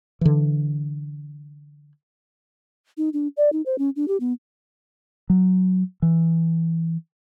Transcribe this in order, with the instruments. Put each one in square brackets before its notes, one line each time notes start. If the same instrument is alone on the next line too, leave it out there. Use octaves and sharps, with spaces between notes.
[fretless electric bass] D3 E3
[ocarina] D#4
D4
D5
D#4
C5
C#4
D4
G4
B3
[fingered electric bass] F#3
E3